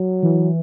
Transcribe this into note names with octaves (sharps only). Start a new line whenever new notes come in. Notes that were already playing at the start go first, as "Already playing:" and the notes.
Already playing: F#3
E3